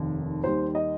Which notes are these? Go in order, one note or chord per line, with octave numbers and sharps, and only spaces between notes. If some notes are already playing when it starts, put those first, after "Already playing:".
Already playing: F1 D#2 D#3
D#2 D#3 G3 C5
D#5